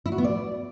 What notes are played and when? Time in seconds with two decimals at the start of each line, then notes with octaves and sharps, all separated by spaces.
0.06 E4
0.12 F#4
0.18 B3
0.24 D5